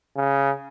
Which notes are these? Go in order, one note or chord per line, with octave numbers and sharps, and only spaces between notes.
C#3